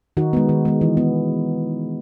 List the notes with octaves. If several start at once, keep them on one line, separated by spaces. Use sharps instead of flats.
D#3 D#4 F#4
G#3 B3
D#3
G#3 B3
E3
B3